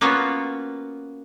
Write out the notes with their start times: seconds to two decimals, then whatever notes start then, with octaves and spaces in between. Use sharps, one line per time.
0.01 A#3 B3 C#4 F4 F#4